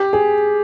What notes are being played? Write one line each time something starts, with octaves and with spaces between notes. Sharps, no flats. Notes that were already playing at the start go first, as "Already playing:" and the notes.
Already playing: G4
G#4